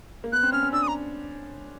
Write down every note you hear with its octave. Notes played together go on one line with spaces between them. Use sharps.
A#3
B3 F#6
C4
C#4 F6
C#4
D4 E6
D#6
A#5